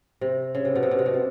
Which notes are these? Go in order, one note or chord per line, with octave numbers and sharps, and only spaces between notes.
C3
C#3
C3
B2
C3
B2
C3
B2
C3